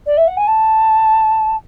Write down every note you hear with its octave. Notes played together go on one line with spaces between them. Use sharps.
D5
E5
F#5
G#5
A5